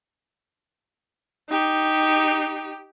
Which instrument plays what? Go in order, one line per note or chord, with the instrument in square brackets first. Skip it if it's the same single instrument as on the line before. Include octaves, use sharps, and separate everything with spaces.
[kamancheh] D#4 G4